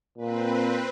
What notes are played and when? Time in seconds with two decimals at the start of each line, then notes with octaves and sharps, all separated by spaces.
0.18 A#2 C4 B4